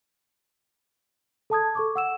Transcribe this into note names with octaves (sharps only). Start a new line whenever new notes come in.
A4 A5 D#6 G#6
A4 C#6 D6
F#5 E6 E7